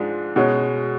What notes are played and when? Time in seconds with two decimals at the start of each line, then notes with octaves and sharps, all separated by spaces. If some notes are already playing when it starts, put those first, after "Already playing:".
Already playing: G#2 F3 G#3 D4
0.36 B2 G#3 C#4